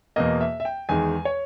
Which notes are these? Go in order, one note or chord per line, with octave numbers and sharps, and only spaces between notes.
E2 B2 A#3 D#5
E5
E5
G5
E2 D#3 G#3 G#5
C#5